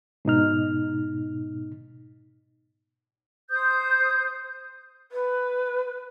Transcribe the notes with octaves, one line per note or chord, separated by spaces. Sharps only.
G#2 B2 D#4 F6
C5 D#6 G6
B4